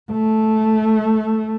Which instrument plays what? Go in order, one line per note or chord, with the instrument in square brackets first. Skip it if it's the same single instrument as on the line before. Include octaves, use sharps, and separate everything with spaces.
[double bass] A3